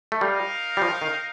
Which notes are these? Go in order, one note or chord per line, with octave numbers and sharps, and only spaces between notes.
A3
G3 D#4 A#4 F5
G3
F3
D#3